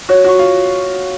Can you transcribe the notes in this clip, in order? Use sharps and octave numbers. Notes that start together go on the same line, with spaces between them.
F#4 C#5
F#4 C#6
F4